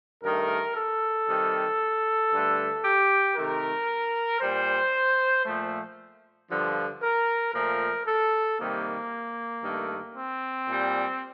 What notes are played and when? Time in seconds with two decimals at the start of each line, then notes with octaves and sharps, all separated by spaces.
0.23 G2 D#3 A3 A#4
0.76 A4
1.28 C3 D#3 G3
2.32 G2 D3 A3
2.85 G4
3.36 C3 D#3 A3 A#4
4.41 A#2 G3 C5
5.45 A#2 F3 A3
6.50 G2 D3 F3
7.03 A#4
7.54 A#2 F3 A3 A#4
8.06 A4
8.59 C3 D#3 G3 A#3
9.63 G2 D#3 A3
10.15 C4
10.68 A#2 G3